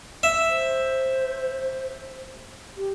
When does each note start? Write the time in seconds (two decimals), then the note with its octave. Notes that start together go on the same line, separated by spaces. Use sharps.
0.23 E5
0.48 C5
2.77 G4